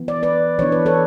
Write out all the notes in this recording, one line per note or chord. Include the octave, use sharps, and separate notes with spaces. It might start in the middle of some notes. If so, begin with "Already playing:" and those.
Already playing: E3 B3
D5
B4 D5
E3 B3 D4 C#5
B4
A4 C#5